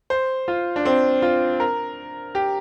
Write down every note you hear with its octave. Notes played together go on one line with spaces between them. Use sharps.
C5
F4
D4
C4
F4
A#4
G4